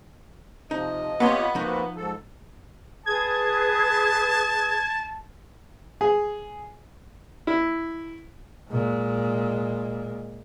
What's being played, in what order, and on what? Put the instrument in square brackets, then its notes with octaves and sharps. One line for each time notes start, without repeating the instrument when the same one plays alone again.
[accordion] C3 F3 [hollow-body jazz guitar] D#4 [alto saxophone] D#5
[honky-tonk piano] B3 [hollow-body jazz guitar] C4 A#5 C6 [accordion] F4 G4 C#5
[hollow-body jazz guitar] F3 D#4 [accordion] A#3 C4 F#4
[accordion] G#2 A4
[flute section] G#4 B4 D#6 [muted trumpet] A5 [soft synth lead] G#6
[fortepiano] G#4
E4
[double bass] A#2 G#3